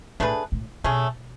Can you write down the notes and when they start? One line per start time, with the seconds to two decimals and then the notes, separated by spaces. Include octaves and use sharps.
0.20 A2 A3 D4 G#4 B4
0.52 A2
0.84 B2 A3 C#4 G#4